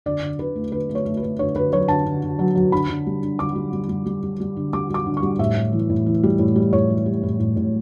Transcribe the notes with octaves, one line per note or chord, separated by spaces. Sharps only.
D3 D5
D3
D3 B4
A3
D3 B4
A3
C#5
A3
B4
A3
D3 C#5
D3 B4
F#3 C#5
D3 A5
D3
D3
F#3
F#3
D3 B5
D3
G3
D3
D3 D6
G3
G3
G3
G3
G3
G3
D3
G3 D6
G3 D6
D3
C#6
G3
A2 E5
A2
E3
A2
E3
G3
A2
G3
A2 C#5
E3
G3
A2
A2
A2